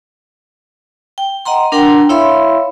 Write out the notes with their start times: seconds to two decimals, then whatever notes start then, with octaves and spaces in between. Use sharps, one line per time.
1.18 G5
1.45 D#5 F#5 A#5 C6
1.72 D4 A#4 F#5 G5 A#5 C6
2.09 E4 C#5 E5 F5 B5 C6